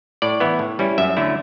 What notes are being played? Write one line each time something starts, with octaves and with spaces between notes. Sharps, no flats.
A2 D5
E3 B3 E4
A2
G3 C#4 E4
F#2 E5
D3 F#3 A3 E4